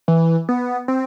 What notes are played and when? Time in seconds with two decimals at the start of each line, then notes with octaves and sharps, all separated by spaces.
0.08 E3
0.49 B3
0.88 C4